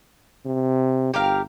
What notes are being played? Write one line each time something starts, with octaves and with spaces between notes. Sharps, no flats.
C3
G1 G4 A#4 F5